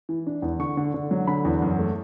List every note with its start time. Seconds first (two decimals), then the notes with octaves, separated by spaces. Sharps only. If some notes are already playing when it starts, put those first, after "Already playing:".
0.09 E3
0.27 D4
0.42 E2
0.59 D3 C#6
0.77 D3
0.94 D3
1.11 F#3
1.27 D3 B5
1.45 E2
1.62 F#2
1.79 A3